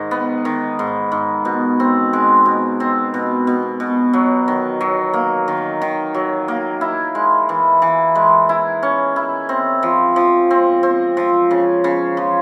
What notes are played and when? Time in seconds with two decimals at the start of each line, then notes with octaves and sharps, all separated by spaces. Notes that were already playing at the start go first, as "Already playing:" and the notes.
Already playing: G#2 D#3
0.11 B3
0.45 D#3
0.79 G#2
1.12 G#2
1.45 B2
1.80 C4
2.13 G#3
2.46 B2
2.80 C4
3.14 B2
3.47 B2
3.80 B2
4.13 F#3
4.48 D#3
4.81 F#3
5.14 A#3
5.48 D#3
5.82 D#3
6.15 F#3
6.48 A#3
6.81 E4
7.15 G#3
7.49 E3
7.82 E3
8.15 G#3
8.49 E4
8.83 C#4
9.16 E4
9.49 C4
9.83 F3
10.16 F3
10.51 C4
10.83 C4
11.17 F3
11.51 C#3
11.84 C#3
12.17 F3